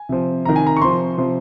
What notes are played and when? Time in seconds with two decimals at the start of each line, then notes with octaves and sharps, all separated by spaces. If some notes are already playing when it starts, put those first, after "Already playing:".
Already playing: G#5
0.09 C3 F3
0.45 C3 D#3 A#5
0.56 G#5
0.67 A#5
0.77 C#6
0.81 C3 F3 C6
1.18 C3 F3